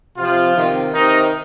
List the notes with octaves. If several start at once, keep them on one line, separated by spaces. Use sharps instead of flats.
C3 F3 F4
C3 D#3
C3 D#3 D#4